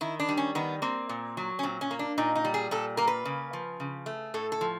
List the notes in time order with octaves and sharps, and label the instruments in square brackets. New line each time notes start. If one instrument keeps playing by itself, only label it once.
[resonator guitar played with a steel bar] D#3 E4
D4
G3
C#4
D#3 B3
A#3 C4
A#2
F#3
C#4
A#2 C4
C#4
A#3
D4
A#2 D#4
D#4
G3
G#4
A#2 A4
A#3 A#4
B4
C#3
F3
C#3
A3
A2 A4
A4
F3